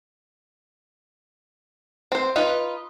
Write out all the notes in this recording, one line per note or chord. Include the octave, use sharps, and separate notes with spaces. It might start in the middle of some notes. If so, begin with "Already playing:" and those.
C4 C5
D#4 F4 B4